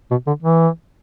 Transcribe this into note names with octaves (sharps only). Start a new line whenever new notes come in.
B2
D3
E3